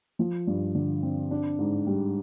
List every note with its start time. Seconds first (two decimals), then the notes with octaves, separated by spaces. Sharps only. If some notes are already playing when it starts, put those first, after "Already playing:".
0.19 F3
0.47 G2
0.75 D3
1.03 C4
1.31 D4
1.59 G#2
1.87 G3